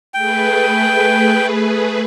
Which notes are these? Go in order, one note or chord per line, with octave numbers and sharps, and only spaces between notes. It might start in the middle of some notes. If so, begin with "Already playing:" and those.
A3 G#4 B4 G5